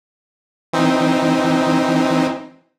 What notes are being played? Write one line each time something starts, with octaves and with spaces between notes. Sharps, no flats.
E3 C4 D#4